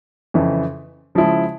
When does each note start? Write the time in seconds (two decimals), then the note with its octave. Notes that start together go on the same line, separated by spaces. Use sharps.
0.34 F2 C#3 E3
1.15 C#3 F3 G#3 E4